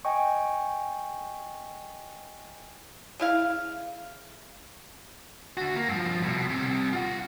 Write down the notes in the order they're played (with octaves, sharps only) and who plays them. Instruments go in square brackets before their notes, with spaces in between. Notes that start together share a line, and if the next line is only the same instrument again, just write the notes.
[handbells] D#5 G5 G#5 C#6
[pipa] C#3 E4 F5
[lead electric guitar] D3 F#4
A#3
G2 F3
C2 B2
C3 G3
F4 F#5